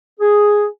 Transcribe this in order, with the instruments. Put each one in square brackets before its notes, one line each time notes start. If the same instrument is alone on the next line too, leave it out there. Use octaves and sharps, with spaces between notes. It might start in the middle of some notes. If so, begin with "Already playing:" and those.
[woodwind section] G#4